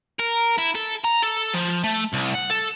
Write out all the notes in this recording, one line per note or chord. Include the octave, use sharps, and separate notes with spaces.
A#4
E4
A4
A#5
A4
F3
A3
C2
F#5
A4